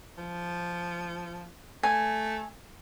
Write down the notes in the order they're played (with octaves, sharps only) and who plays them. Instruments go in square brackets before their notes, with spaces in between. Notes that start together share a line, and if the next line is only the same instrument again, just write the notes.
[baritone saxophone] F3
[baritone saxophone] A3 [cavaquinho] G#5